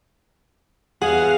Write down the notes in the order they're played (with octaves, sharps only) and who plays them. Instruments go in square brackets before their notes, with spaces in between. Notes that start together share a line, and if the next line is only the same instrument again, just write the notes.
[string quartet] E2 F5 [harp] G#4 [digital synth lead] F#5